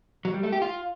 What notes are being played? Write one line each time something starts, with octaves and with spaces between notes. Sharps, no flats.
F#3
G3
A3
G4
F4